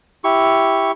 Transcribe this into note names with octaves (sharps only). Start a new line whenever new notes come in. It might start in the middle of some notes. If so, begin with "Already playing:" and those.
E4 G4 C#6